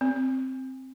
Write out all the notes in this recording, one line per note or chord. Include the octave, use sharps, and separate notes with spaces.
C4